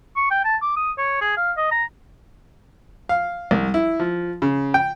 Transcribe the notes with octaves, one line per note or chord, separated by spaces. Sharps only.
C#6
G5
A5
D6
D#6
C#5
G#4
F5
D#5
A#5
F5
C2
E4
F3
C#3
G5